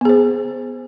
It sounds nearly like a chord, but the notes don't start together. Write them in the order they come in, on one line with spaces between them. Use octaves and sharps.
B3 G#4 C5